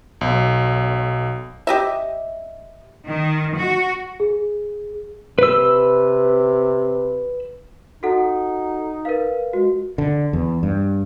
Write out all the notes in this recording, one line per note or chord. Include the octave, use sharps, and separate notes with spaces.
B1
G4 D#5 E5
D#3
F#4
G#4
C3 B4 E6
D#4 F#4 A4 F#5
A#4 B4 F5
G#3 F#4
D3
E2
G2